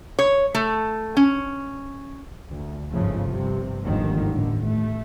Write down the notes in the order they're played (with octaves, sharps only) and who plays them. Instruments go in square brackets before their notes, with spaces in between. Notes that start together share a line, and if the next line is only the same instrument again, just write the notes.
[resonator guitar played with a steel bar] C#5
A3
C#4
[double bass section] D2
G1 G#2 C#3 F3 A3
G2 C3
G1 D#2 G#2 D3 D#3 F3
A1 A2 D3
A3